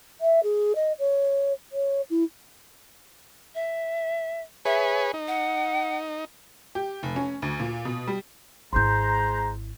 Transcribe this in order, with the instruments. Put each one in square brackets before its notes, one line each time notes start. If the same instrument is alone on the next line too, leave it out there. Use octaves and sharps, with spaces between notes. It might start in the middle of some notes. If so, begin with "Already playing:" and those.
[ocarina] E5
G#4
D#5
C#5
C#5
E4
[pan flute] E5
[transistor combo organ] G#4 B4 C#5 [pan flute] E5
[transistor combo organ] D#4
[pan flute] F#5
[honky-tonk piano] G4
F1
C#4
D2
A#2
B2
G3
[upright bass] G#1 E4 [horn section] G#3 C5 A#5 [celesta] C6 G6